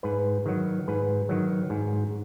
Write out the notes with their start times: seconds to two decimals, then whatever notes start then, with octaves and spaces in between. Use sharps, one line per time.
0.03 G#2 B4
0.46 D#3 F#3
0.88 G#2 B4
1.29 D#3 F#3
1.70 G#2